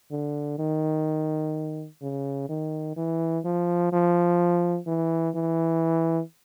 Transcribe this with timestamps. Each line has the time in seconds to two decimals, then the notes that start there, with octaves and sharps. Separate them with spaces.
0.11 D3
0.58 D#3
2.02 C#3
2.49 D#3
2.96 E3
3.45 F3
3.92 F3
4.87 E3
5.35 E3